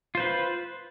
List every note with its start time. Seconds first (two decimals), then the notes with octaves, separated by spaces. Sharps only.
0.15 F4
0.17 C5
0.20 B4